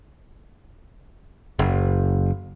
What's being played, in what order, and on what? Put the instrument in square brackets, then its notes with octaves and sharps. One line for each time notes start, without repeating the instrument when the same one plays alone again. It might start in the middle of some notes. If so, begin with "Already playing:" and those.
[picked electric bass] F#1